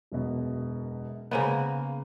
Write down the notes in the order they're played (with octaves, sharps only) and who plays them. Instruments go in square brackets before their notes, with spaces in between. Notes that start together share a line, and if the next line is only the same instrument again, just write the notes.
[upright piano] E1 F#2 B2
[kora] C#3 A#3 B3 [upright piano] G#3 C5 D#7